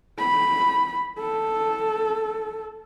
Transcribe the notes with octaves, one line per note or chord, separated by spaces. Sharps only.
B5
A4